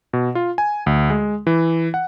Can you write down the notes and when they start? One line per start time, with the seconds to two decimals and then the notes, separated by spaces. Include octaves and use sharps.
0.13 B2
0.35 F4
0.58 G#5
0.86 D2
1.10 G#3
1.47 E3
1.94 F#5